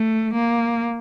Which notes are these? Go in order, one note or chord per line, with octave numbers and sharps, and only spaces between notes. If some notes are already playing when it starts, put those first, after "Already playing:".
Already playing: A3
A#3